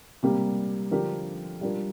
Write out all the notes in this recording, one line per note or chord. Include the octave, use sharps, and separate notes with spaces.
C3 G3 A#3 G4
D3 F3 D4 G4 A#4
G3 D4 F4 A#4